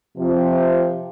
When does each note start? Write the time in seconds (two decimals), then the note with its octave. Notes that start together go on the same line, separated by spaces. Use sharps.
0.16 C3 F3